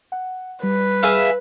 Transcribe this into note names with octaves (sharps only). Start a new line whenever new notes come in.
F#5
G3 B4
G#4 E5 F5